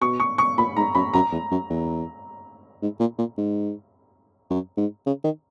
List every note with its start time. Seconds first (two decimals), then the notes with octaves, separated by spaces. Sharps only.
0.01 B2 C#6
0.20 C#6
0.38 C#6
0.58 A#2 B5
0.77 G#2 A#5
0.95 F#2 B5
1.14 F#2 A#5
1.32 E2
1.51 F#2
1.70 E2
2.82 G#2
3.00 A#2
3.19 A#2
3.38 G#2
4.50 F#2
4.77 G#2
5.06 C#3
5.24 D#3